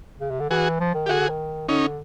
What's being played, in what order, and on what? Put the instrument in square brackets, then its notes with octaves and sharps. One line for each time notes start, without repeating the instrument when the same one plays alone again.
[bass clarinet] C#3
C3
D3
[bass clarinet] E3 [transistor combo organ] F#4 G#4
[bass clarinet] F3
D#3
[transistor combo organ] G4
[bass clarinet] D3 [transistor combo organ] F#4 G#4
[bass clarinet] D3
D#3
[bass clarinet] D3 [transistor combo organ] C#4 D#4